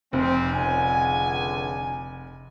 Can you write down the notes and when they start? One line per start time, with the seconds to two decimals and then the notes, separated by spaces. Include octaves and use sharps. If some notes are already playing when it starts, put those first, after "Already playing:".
0.13 F1 C4
0.53 C#2 D3 G#5